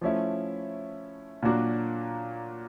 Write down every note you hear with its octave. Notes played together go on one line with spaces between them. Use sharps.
F3 A3 C#4 E4
A#2 F#3 A#3 D4 F#4